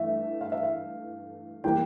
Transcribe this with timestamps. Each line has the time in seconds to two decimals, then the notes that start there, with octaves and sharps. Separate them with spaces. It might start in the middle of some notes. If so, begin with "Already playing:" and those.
Already playing: G2 E3 A3 E5
0.41 F5
0.52 E5
0.63 F5
1.64 E3 G3 A#3 G5